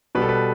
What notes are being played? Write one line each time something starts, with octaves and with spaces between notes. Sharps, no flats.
B2 G3 B4
A4
B4